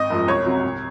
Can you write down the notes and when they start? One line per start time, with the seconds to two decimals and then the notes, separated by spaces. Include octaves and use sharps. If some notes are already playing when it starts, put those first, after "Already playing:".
Already playing: G#1 D#5
0.10 F#2 F3 G#3
0.27 C2 C#5
0.46 C3 F#3
0.64 C2